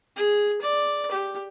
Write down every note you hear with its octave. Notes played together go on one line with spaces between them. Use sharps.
G#4
D5
G4